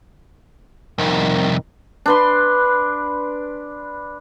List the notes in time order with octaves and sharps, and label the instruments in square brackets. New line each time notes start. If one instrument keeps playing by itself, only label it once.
[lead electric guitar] C2 F2 [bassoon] D#3
[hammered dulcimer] D4 B4 C6